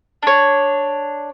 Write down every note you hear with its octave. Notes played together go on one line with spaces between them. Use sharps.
D4 C#5